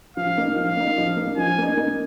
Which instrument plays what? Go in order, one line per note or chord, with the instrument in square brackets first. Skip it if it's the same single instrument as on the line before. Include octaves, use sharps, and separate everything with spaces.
[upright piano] F3 [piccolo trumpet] F5
[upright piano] A#3 D#4
[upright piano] F3 [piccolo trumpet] F5
[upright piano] A#3 D#4
F3
A#3
D#4
[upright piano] F3 [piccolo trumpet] G#5
[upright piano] A#3 D#4
A#3